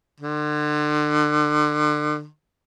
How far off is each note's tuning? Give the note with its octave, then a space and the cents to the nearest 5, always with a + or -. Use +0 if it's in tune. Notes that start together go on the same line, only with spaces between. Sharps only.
D3 +35